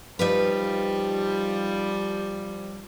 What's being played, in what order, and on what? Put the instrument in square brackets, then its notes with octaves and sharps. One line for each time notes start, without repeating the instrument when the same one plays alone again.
[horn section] F3 G3 [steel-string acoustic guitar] D#4 F4 B4